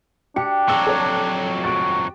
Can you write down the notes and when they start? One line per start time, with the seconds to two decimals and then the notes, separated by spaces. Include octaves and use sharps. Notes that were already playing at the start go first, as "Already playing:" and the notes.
0.36 D4 G4 C#7
0.68 F2 F#3 C#6 E6 C#7
0.87 A4 C#5
1.64 F#4 A6 D7